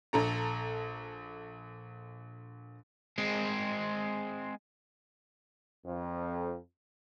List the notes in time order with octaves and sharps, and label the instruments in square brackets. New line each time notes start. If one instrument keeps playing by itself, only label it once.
[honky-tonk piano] A#1 A4 A#5
[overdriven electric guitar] G#3 C4
[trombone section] F2